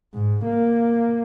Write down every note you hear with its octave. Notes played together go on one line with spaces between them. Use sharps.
G#2
A#3